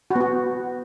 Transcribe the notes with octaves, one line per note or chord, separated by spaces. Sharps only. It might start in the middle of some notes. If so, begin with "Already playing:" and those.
F#4
B3
F#4